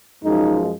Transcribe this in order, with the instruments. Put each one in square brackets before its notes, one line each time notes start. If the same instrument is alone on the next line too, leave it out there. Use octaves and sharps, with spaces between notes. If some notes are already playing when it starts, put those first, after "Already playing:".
[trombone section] F#2 F3 G#3 D#4